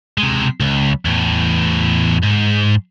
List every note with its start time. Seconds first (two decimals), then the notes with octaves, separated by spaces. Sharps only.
0.18 C3 G#3
0.60 C#2
1.05 E2 A2
2.23 G#2